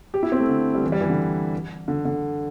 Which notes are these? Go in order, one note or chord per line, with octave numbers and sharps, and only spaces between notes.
G4
E4
C4
A3
D3
G3
E3
G3
E3
D3
D3
D3